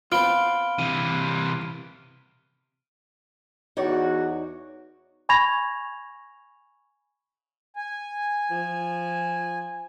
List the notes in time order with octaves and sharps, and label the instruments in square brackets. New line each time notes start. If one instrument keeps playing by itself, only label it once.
[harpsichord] B3 C4 [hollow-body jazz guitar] F4 [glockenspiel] F6 D7 G7
[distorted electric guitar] C3 E3 [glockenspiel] D#7
[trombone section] E2 F#4 [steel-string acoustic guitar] D#4 C#5 D5
[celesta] G#5 B5 C#6 G#6 A#6 F7
[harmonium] G#5
[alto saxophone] F3